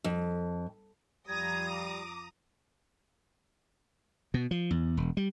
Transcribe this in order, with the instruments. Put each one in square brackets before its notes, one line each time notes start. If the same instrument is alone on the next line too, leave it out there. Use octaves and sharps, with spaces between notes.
[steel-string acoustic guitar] F2
[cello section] F2 F4 [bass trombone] G3 [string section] A#5 D#6 A#6 [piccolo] G#6
[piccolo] D6
[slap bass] B2
F3
E2
E1
G3